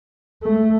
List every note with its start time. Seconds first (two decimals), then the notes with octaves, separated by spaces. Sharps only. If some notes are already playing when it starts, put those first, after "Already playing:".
0.43 A3